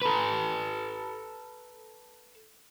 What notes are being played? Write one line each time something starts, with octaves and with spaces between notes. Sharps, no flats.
A4 B4